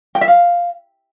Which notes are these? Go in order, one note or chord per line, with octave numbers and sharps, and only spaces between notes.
G5
E5
F5